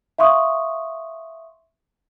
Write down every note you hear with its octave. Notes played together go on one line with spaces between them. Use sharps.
E5 F5 C6 C#6 D#6